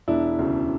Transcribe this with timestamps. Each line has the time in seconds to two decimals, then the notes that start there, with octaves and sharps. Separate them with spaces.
0.08 E1 D4 E4
0.39 D2 C#3